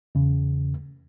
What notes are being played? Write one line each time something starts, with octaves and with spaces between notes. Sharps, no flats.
E2 C#3